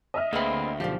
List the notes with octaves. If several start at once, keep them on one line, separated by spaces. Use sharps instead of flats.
D#5 E5 F6
D2 A#3 C4 G#4 B4 B5
B1 F#2 F3 G4 D5 F5